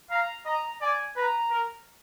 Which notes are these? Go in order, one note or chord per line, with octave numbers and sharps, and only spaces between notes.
F5 A#5
D#5 A#5
D5 G#5
B4 A#5
A#4